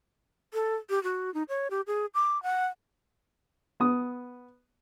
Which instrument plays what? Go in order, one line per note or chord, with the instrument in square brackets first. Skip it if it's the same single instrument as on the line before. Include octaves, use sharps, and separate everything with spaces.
[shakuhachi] A4
G4
F#4
D#4
C#5
G4
G#4
D6
F#5
[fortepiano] B3 D#6